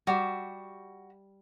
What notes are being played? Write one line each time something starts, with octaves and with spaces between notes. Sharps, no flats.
G3 F#4 G4 E5